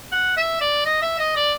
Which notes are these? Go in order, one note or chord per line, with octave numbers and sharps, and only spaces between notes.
F#5
E5
D5
D#5
E5
D#5
D5